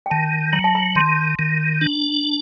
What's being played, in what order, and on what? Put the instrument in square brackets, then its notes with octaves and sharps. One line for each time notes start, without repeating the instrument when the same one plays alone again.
[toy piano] G5
[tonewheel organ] D#3 [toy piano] A5
[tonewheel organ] F#3 [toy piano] A#5
[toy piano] A5
A#5
[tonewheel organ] D#3 [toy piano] C6
[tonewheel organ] D#3
D4